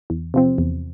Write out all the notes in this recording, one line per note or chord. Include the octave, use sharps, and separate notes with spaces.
E2
C3 F3 C4
E2